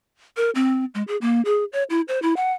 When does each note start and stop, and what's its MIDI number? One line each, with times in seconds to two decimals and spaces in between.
0.37 0.50 70
0.55 0.85 60
0.95 1.03 56
1.08 1.17 68
1.21 1.41 58
1.45 1.64 68
1.73 1.83 73
1.90 2.01 64
2.08 2.21 72
2.22 2.34 64
2.37 2.53 78